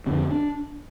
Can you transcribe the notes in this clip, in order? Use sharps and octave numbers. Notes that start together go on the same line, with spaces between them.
F2 D3 C4
D4